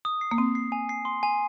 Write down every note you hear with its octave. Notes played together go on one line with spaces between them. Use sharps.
D#6
C7
A#3
C4 D#6
C7
G#5
C7
C6
G#5